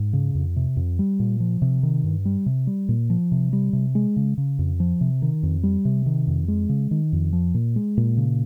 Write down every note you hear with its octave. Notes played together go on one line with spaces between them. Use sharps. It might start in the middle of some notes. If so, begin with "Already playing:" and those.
Already playing: G#2
C#3
F2
C3
F2
G3
A#2
F3
C3
D#3
G2
G3
C3
G3
A#2
F3
C3
G3
C3
G#3
C#3
C#3
F2
F3
C3
D#3
F2
G3
C3
D#3
F2
G#3
C#3
D#3
F2
F3
A#2
G#3
A#2
C#3